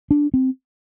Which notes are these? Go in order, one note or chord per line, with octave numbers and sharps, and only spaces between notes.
D4
C4